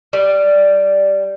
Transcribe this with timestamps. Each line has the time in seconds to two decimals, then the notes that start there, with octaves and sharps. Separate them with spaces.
0.13 G3